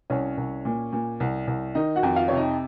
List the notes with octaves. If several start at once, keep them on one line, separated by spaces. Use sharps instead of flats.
C2 C#4 C#5
C2
A#2
A#2
C2
C2
D#3 D#4 D#5
F#4 F#5
F2
F4 F5
C3 C#5
D#4 D#5